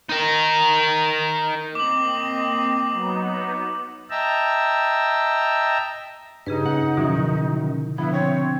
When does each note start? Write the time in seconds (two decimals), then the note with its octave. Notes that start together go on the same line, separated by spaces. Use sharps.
0.10 D#4 A#4
1.75 A#3 C4 D#5 D6 F#7
2.91 F#3 B3 D#4
4.10 D#5 E5 G5 A5 A#5 E6
6.46 G2 C#3 D#4 G#4 B4
6.66 C#4 F#5
6.97 F#2 B2 D3 D#3 F3 F#3 E4
7.98 D3 F3 B3 E4 E5 F#5
8.13 C4 C#5